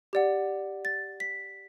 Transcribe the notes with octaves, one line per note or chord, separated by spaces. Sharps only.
G4 D5 F#5
A6
B6